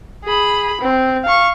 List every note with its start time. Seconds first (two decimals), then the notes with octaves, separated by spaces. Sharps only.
0.24 G#4 B5
0.81 C4
1.24 F5 C#6